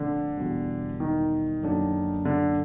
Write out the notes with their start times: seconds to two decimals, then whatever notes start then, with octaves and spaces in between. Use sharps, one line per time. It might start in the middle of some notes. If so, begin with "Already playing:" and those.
Already playing: A#2 D3 F3 A3 C4
0.38 E2 B2 G3
1.00 D#3
1.63 F#2 D3 F#3 A#3 D4
2.25 D3